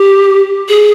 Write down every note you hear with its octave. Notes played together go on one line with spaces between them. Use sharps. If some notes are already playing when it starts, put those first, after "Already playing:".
Already playing: G4
G#4